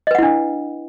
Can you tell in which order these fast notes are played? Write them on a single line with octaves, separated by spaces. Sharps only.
D#5 B4 F#5 E4 D4